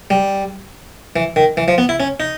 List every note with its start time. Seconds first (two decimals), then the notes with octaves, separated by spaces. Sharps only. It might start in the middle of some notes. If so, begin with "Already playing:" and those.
0.10 G3
1.16 E3
1.36 D#3
1.57 E3
1.68 F3
1.78 B3
1.89 E4
2.00 C#4
2.20 D#4